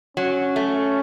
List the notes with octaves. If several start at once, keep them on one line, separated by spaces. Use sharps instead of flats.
F#3 C#4
A3